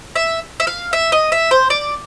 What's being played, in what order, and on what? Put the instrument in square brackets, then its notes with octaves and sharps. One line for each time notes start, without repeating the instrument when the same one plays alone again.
[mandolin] E5
E5
F5
E5
D#5
E5
C5
D5